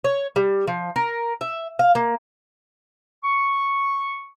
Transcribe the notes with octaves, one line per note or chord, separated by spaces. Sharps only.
C#5
G3
F3
A#4
E5
F5
A#3
C#6